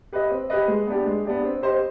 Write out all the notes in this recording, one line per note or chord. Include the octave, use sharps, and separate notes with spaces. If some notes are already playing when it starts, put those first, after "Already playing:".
G4 B4 D#5
C4
G4 B4 D#5
G#3
B3 D4 G4
G#3
B3 D4 G4
C4
G4 C5 D#5